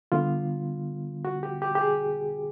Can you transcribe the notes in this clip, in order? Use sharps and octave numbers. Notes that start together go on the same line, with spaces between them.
D3 G3 B3 F4
F#4
G4
G4
G4
G#4